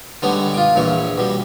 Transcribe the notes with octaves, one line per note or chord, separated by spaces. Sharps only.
D3 G3 G#3 B3 C#5
F4 D6
A#1 E2 E3 C#5
B2 G3